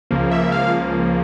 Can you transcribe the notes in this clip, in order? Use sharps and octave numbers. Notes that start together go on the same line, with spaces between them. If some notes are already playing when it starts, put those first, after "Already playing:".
C#2 C#3 F3 A#3
E5
F5